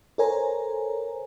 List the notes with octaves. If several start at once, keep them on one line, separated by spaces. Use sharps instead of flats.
A4 A#4 C5 C#5 G#5 A#5